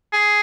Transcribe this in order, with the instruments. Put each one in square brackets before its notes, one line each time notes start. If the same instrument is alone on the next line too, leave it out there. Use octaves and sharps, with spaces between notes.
[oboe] G#4